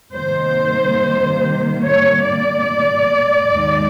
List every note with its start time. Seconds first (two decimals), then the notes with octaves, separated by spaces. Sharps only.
0.13 C3 D#3 G3 A#3 C5
1.83 C#5
2.25 D5
3.53 D#2 D#3 G#3